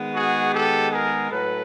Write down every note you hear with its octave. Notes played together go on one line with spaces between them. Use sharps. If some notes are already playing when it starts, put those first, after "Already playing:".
Already playing: D#3 G#3 B3
F#4 G#4
G4 A4
G#4 A#4
A2 F#3 A4 B4